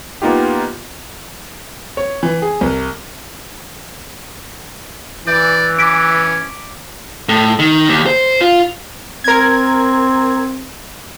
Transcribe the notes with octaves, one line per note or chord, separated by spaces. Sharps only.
A#3 B3 D#4 F4 G4
C#5
E3
G#4
C2
E3 D5 G6
C#4 D6 B6 D7
A2
D#3
D#2
C5
F4
C4 A#4 G#6